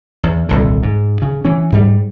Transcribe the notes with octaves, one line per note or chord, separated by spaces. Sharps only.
E2
D#1 C2 D3
G#2
C#3
E3 C#4
G#2 G3